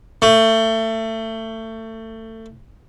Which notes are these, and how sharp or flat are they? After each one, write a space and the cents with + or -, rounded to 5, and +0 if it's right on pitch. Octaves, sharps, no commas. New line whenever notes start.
A3 +25